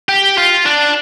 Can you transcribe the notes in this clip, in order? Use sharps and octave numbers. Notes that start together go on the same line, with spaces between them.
G4
F4
D4